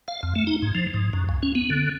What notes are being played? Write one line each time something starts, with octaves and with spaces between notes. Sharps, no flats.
F5
F2
A3
D#4
G#2
F3
G#2
F#2
C#2
C#4
B3
D3